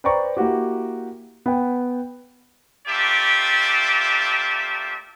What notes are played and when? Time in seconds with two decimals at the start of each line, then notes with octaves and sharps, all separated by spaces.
0.04 B4 C5 D5 G5 A#5 C#6
0.37 A#3 E4 F#4 G4
1.46 B3 B4 F#5 G5
2.87 A3 A#3 F4 G4 D5 E5